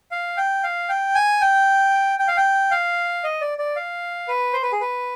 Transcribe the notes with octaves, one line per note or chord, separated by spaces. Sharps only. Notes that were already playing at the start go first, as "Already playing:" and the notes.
F5
G5
F5
G5
G#5
G5
G5
F5
G5
F5
D#5
D5
D5
F5
B4
C5
B4
G#4
B4